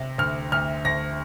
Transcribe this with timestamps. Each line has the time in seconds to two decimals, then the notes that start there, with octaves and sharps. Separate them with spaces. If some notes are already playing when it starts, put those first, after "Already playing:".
Already playing: C3
0.18 D2 F6
0.52 D2 F6
0.85 D2 A#6